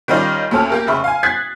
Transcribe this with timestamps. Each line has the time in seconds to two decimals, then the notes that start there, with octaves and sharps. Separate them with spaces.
0.08 D#3 G3 C#4 D#4 F4 D5
0.51 D2 A#2 C#4 A4 A5 F6
0.70 A#3 G4 A#4
0.87 F1 C#3 E5 B5 C#6
1.04 F5 G#5
1.23 D#6 F#6 G#6 A6 B6 C7